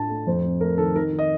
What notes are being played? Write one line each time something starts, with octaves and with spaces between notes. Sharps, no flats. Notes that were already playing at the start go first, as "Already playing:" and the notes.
Already playing: A2 D4 F4 A5
A3
F2 C5
C4
A3 A#4
D#3 A4
D#3 A#4
D#3
D#5